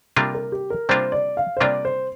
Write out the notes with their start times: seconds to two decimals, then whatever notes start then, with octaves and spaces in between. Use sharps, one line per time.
0.16 C3 G3 A#3 D4 F4 A#4
0.34 A#4
0.52 G4
0.70 A#4
0.89 C3 G3 A#3 D4 F4 C5
1.12 D5
1.37 F5
1.57 C5
1.61 C3 G3 A#3 D4 F4 D5
1.85 C5